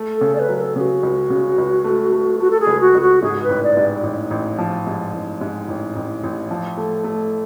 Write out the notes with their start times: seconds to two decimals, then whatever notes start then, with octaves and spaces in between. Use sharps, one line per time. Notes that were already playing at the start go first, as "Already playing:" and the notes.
Already playing: A3
0.14 A4
0.21 C#3
0.35 D5
0.39 B4
0.49 F#3
0.55 B4
0.60 A4
0.75 C#3 F#4 G#4
1.03 C#2
1.30 C#3
1.58 C#2
1.84 A3
2.12 A3
2.39 A3 F#4
2.50 A4
2.60 G#4
2.67 C#2
2.80 F#4
2.94 C#2
3.01 F#4
3.22 G#2 G#4
3.43 B4
3.49 A1
3.63 D5
3.77 G#2
4.03 A1
4.31 A1
4.58 F3
4.86 G#2
5.13 A1
5.41 G#2
5.68 A1
5.96 A1
6.23 A1
6.51 F3
6.77 A3
7.04 A3